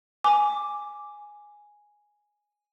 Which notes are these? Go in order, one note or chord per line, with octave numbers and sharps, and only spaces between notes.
G#5 D6